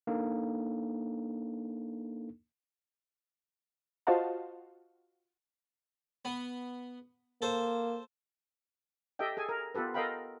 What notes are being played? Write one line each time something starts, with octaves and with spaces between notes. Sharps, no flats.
A#3 D4 D#4 A4
F4 F#4 C5 D#5 F5 A5
B3
A#3 A4 C5
G4 A4 D#5 E5 G5
G#4 A4 G#5
A#4
B3 F4 G4 A4 B4
A4 A#4 D#5 F5 G5 B5